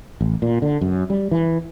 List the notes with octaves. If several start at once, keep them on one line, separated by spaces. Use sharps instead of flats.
A1
A#2
D3
F#2
G3
E3